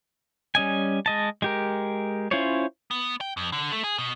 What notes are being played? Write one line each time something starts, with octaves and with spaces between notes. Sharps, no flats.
G3 C#4 D#5 G#5
G#3 D#5 A5
G#3 G4 A#4
C#4 E4 F4 C5 C#5
B3
G5
F2
D3
A3
G#4
B2